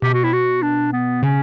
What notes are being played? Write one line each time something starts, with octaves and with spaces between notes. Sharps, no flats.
B2 G4
F#4
E4
F#4
D4
B3
C#3 C#4